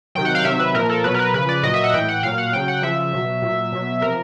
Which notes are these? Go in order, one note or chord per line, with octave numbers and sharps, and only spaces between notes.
C3 D#3 F#3 G5
F#5
F5
C3 D#3 F#3 E5
B4
A#2 F3 A#4
A4
B2 F#3 B4
A#4
B4
C#3 F3 B4
D5
A#2 F#3 D#5
E5
F#5
A2 E3 G5
F#5
A#2 F#3 F5
F#5
C#3 F#3 G5
F#5
C#3 F3 E5
B2 F#3
A#2 F#3
B2 F#3
C3 F3 A#4